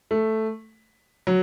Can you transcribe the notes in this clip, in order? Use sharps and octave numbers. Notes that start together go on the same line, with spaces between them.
A3
F#3